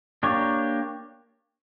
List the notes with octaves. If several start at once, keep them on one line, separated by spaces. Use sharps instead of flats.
A#3 D4 G4 C#5